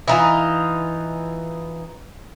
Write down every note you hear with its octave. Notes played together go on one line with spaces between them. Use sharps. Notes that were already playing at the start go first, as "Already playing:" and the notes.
E3 D#4 F4